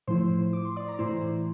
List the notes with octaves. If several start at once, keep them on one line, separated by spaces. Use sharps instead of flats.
A2 F3 A3 E4 C5 C6
D6
C6
D5 D6
A#5
A2 E3 A3 E4 C5 C6